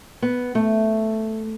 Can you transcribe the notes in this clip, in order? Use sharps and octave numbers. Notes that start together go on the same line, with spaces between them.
B3
A3